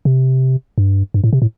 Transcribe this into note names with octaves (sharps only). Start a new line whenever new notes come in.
C3
G2
G2
A2
C3
A2